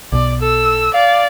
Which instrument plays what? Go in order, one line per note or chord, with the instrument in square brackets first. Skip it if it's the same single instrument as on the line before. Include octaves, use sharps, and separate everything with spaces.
[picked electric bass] B1 B2 [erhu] D5
[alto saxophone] A4 [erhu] E6
[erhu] D5 [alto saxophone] F5